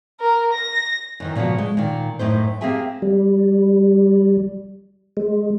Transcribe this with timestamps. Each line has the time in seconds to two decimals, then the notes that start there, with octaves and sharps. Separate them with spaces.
0.20 A#4
0.53 A#6
1.20 F#2 D#3 E3
1.35 A#2 C#3 F3 B3 F#4
1.58 G#3
1.77 A#2 D#3
2.19 F#2 A2 D#4 C5
2.61 A#3 C4 G4 G#4 E5 G#5
3.02 G3
5.17 G#3